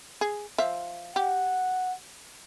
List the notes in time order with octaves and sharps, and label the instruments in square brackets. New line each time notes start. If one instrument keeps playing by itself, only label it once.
[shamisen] G#4
F3 E5
[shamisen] G4 [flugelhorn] F#5